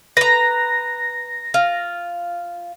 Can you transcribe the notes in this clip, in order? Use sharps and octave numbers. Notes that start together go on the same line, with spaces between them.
B4 A#5 A#6
F4